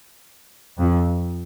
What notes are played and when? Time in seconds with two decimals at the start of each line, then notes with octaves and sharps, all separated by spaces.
0.78 F2